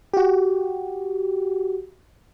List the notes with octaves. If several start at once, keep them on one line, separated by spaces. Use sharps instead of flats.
F#4 G4